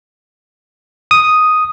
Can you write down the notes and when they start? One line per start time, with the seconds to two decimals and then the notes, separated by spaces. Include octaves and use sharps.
1.11 D#6